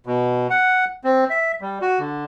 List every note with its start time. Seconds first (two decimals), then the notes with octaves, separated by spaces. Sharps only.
0.06 B2
0.50 F#5
1.04 C4
1.30 E5
1.61 G3
1.82 F#4
1.99 D3